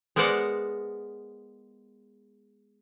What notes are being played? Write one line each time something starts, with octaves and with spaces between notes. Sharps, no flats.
G#3 B3 A#4 C5 D5 F#5